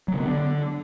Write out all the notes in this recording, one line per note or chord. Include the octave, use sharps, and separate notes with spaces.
F#3
C#3
B3
D3